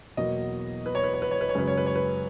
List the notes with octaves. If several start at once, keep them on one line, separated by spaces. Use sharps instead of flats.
E2 B2 F#3 A#3 D#5
B4
C#5
B4
C#5
B4
C#5
B4
C#5
F#2 C#3 G#3 C#4 B4
C#5
B4
C#5
B4